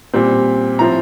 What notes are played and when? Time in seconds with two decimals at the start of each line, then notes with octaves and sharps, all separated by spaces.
0.13 A#2 G3 C4
0.79 A2 F3 C4 A#5